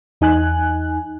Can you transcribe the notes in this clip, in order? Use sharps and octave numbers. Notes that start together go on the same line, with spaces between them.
E2 D#4 G#5 F#6